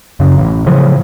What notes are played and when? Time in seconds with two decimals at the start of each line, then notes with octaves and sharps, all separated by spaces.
0.20 F#2 C#3
0.38 A1
0.66 A2 C#3 F3 F#3